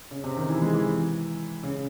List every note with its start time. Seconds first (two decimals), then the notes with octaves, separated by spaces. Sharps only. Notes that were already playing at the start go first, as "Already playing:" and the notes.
0.11 C#3
0.24 C3
0.36 D#3
0.49 E3
0.62 G#3
0.74 E3
1.63 C#3